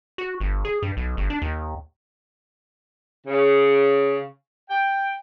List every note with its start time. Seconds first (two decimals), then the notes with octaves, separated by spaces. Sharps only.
0.18 F#4
0.41 G1
0.65 G#4
0.83 G2
0.97 B1
1.17 G1
1.30 D4
1.42 D#2
3.26 C#3
4.69 G5